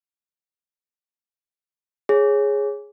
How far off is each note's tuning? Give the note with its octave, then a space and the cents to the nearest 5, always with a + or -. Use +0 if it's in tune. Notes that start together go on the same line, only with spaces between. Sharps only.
G#4 +0 C#5 -10